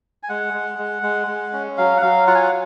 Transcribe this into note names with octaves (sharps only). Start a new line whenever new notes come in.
G#5
G#3 F#5
G#3
G#3
G#3
G#3
C#4
F#3 F5
F#5
F#3 F5
F4 F#5
G#5
F#5